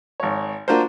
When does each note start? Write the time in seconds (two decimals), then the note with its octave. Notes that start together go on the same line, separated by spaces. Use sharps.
0.20 G#1 C#5
0.68 A#3 D4 F4 F#4 A#4 C5